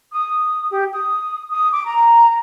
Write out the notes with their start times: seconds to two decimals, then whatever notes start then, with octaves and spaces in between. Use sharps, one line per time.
0.13 D#6
0.70 G4
0.93 D#6
1.51 D#6
1.72 D6
1.86 A#5